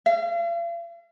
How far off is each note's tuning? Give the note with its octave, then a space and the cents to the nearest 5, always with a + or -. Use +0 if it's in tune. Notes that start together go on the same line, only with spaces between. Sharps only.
F5 -45